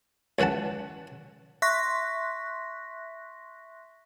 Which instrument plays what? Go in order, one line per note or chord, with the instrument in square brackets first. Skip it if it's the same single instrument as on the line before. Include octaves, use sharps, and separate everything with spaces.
[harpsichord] C#2 E3 B4 F#5 A5
[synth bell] E5 C6 C#6 F#6 A#6 B6